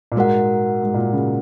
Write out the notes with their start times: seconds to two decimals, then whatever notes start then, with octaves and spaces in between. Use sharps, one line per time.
0.12 A#2
0.16 G#2 F#4 A#4 F#5
0.83 G#2
0.94 A#2
1.13 C#3